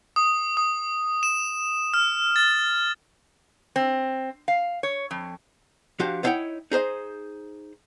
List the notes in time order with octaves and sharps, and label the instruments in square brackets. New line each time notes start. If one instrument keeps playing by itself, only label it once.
[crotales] D#6
D#6
E7
F6
A6
[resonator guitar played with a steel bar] C4
F5
C#5
F2
[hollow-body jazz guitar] F3 D4 F#4 G4 F5
B3 D#4 E4 C#5 F#5 G5
D#4 G#4 C5 D#5